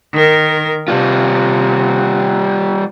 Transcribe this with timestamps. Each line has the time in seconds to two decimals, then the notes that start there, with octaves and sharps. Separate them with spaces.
0.13 D#3 A#4
0.88 C3 G3 F4